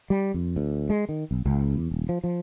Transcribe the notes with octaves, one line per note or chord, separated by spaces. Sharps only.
G3
F2
D2
G#3
D#3
B1
C#2
E2
D#1
F3
F3